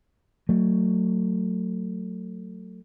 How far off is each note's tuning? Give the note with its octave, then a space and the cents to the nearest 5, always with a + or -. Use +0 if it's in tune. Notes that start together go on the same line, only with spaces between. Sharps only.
F#3 +0 A3 +25